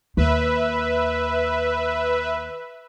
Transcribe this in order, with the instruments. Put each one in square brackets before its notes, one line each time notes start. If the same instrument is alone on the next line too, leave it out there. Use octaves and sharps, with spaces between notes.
[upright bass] D#2 [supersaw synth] B4 E5